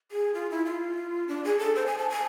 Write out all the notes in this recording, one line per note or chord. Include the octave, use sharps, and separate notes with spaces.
G#4
F4
E4
F4
D4
G#4
A4
C5
G#5
A5
G#5